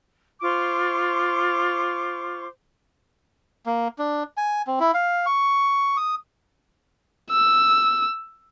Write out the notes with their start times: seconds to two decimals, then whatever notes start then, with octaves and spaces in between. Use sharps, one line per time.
0.40 F4 C5 C#6 D6
3.66 A#3
3.99 D4
4.37 G#5
4.67 C4
4.80 E4
4.94 F5
5.26 C#6
5.97 D#6
7.31 E6